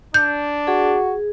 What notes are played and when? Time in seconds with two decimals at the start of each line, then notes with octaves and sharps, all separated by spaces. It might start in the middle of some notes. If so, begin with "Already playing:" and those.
0.14 D4 G6
0.67 F#4 G#4